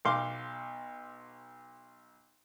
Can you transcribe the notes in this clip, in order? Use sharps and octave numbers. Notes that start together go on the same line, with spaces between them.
B1 F5 C6 D6